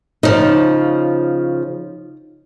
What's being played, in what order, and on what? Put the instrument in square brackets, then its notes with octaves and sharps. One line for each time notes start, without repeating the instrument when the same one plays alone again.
[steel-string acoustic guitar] C#3 F3 [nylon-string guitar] D#4